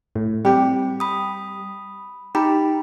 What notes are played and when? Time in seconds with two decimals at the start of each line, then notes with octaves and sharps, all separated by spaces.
0.16 A2
0.45 G3 C4 G4 G5
1.00 B5 D#6
2.35 D#4 G4 A#5 B5